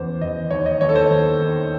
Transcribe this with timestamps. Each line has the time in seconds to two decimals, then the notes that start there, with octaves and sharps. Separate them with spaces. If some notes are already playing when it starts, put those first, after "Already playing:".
Already playing: E2 C#3 E3 C5
0.21 E2 D#5
0.51 D#2 C#5
0.66 D#5
0.81 D#2 C#5
0.89 A4
0.95 C5
1.10 D#2
1.40 D#3